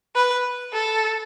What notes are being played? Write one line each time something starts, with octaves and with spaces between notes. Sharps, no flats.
B4
A4